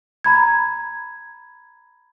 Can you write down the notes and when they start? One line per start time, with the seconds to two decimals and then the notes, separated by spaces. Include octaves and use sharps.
0.24 A#5 B5 G#6